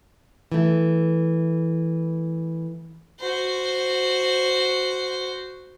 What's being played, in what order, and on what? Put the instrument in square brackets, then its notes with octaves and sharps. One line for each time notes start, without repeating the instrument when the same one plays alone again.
[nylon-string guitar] E3 A3
[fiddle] F#4 C5